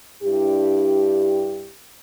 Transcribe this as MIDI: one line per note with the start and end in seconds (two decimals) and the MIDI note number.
0.24 1.71 43
0.24 1.71 62
0.24 1.71 64
0.24 1.71 67